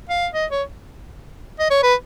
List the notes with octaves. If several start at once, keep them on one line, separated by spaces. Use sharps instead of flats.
F5
D#5
C#5
D#5
C#5
B4